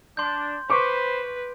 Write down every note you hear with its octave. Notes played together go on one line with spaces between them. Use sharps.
D4 C6 G6
B4 C5 B5 C#6 D6